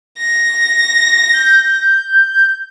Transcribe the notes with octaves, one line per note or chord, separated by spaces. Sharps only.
A#6
G6